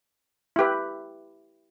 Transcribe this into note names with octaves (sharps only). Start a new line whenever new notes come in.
E4 G4 B4